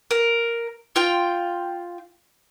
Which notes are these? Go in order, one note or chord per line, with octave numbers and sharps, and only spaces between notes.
A#4
F4 G5